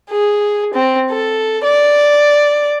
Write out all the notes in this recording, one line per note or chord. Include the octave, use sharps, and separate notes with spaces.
G#4
C4
A4
D5